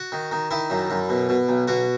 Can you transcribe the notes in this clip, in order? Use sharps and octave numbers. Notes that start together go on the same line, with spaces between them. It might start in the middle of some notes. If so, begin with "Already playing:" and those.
Already playing: F#4
D#3
D#3
D#3 E4
F#2
F#2
B2
B2
B1
B2 F#4